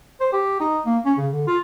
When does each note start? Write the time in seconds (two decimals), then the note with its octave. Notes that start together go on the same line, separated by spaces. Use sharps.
0.20 C5
0.33 G4
0.60 D#4
0.86 A#3
1.05 C#4
1.18 C#3
1.31 D3
1.47 F4